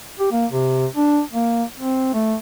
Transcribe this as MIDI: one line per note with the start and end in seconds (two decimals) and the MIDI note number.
0.20 0.31 67
0.32 0.46 58
0.52 0.86 48
0.96 1.20 62
1.32 1.64 58
1.78 2.11 60
2.14 2.36 57